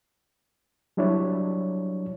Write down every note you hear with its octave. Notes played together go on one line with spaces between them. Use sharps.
F#3 G3 D4 E4 C#5